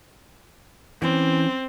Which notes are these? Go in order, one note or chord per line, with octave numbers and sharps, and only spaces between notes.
E3 C4 C#4